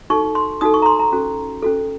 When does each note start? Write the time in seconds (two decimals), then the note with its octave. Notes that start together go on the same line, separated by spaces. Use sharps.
0.10 D#4 F#4 A4 C#6
0.35 C6
0.61 D#4 F#4 A4 D#6
0.74 C#6
0.82 A#5
0.86 C6
0.99 A#5
1.12 C#4 F#4 A4
1.63 C#4 F#4 A4